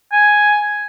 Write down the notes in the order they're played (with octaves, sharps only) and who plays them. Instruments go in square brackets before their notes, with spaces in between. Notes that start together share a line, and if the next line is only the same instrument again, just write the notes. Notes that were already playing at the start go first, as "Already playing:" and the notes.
[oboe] G#5